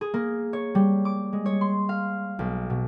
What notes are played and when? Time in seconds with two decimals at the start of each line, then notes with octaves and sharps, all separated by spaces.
0.01 G#4
0.14 A#3
0.53 C#5
0.75 G3
1.05 D6
1.33 G#3
1.46 C#5
1.61 C6
1.89 F5
2.39 B1
2.70 B2